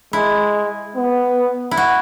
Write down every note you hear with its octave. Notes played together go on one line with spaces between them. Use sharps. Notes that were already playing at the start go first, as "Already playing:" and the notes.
G#3 E4
B3
E4
F#4